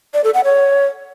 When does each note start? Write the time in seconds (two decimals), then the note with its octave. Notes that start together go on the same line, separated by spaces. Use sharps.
0.14 D5
0.24 A4
0.34 F#5
0.44 C#5